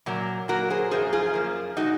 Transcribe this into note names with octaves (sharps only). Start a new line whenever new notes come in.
A#2 F#3 A#3
A#2 F#3 A#3 F#4 A#4
G#4 C5
F#2 F3 A#3 G#4 C5
F4 G#4
F#2 F3 A#3
A#2 G#3 D#4 F#4